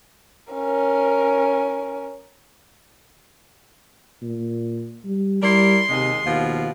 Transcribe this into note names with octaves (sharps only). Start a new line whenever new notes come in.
C#4 A#4
A#2
G3
G3 E4 A#4 D5 C6
D#2 C3 G#3 D#4
D#2 B2 F3 F4